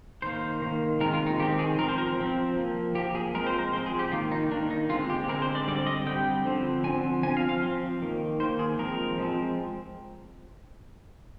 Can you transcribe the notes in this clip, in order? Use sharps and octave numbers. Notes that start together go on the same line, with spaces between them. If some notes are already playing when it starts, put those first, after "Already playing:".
D#3 A#3 C5
D#3 A#3
D#3 G#3 C4 A#4
F4
D#4
D#3 G#3 C4 G4
G#4
F3 C4 A#4
C5
A#4
F3 C4
F3 A#3
F3 A#3 G4
G#4
F3 G#3 C4 A#4
C5
A#4
F3 G#3 C4 C5
G#4
G4
D#3 A#3 F4
D#4
D#3 A#3 D4
D#4
D3 G#3 C4 F4
G4
D3 G#3 C4 A#4
C5
D5
D3 G3 C4 D5
D#5
D3 G3 C4 G5
D3 F3 C4
D3 F3 C4 G#5
F3 C4 G#5
F5
F5
F3 C4
D#3 A#3
D#3 A#3 C5
G#4
F3 G#3 C4 A#4
F3 G#3 C4